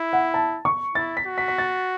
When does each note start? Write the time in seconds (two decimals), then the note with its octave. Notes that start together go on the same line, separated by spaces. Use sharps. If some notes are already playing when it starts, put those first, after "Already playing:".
Already playing: E4
0.13 F#5
0.34 A5
0.65 C#6
0.95 E4 A6
1.17 B6
1.27 F#4
1.38 B6
1.48 B6
1.58 A6